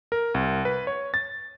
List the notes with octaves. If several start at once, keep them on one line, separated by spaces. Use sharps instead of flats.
A#4
C2
B4
C#5
A6